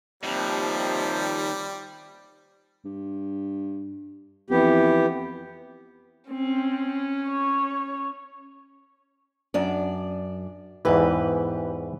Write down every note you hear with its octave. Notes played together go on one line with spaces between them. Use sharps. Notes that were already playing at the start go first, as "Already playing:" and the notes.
D#2 G#2 C3 F3 G3
G2
F2 E3 B3 G4
C4 C#4
C#5
F#2 D4 D5
E2 G#2 E3 G4 B4